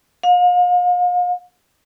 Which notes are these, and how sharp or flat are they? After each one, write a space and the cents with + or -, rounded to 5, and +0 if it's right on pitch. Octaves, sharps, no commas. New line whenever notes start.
F5 +40